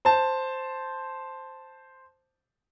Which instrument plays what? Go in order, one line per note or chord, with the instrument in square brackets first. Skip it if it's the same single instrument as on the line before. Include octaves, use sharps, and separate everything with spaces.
[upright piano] C5 A5